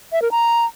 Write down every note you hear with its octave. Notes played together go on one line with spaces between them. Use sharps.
E5
A#4
A#5